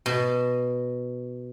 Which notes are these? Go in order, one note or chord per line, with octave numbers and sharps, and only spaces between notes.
B2